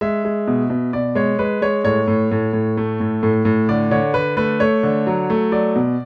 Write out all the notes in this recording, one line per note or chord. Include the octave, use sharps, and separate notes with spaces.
G#3 E5
G#3
B2
B2
B2 D5
G#3 C#5
G#3 B4
G#3 C#5
A2 C#5
A2
A2
A2
A3
A2
A2
A2
D3 D5
D3 C#5
D3 B4
A3 B4
A3 C#5
D3
F#3
A3
F#3 D5
B2